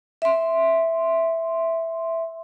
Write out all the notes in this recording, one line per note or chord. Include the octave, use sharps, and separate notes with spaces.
E5 C6